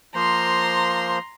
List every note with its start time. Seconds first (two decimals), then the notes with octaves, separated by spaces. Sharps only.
0.15 F3 A#3 C5 A#5 C6